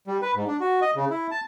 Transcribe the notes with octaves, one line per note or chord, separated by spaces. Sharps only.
G3
B4
G#2
D4
F#4
D#5
C#3
E4
A5